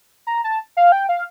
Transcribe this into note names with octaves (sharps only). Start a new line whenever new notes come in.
A#5
A5
F5
G5
F5